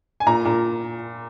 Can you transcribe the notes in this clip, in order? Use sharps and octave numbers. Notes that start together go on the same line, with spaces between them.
G#5
A#2 A#5
A#2